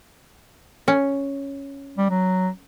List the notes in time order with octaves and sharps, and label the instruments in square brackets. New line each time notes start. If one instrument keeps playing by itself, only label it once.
[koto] C#4
[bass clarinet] G3
F#3